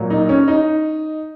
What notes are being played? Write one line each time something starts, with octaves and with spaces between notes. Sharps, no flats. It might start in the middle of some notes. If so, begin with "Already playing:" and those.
Already playing: A#2 F#3 A#3
D#4
C#4
D#4